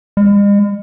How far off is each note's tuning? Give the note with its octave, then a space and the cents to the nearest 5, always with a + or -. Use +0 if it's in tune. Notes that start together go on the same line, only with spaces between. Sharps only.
G#3 -45